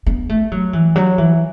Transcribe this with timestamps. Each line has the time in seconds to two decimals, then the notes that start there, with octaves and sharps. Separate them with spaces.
0.06 B3
0.29 A3
0.52 F#3
0.73 E3
0.96 F#3
1.18 E3